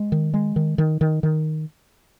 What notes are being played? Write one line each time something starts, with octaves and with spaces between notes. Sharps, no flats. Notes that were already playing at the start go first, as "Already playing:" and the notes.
Already playing: G#3
D#3
G#3
D#3
D#3
D#3
D#3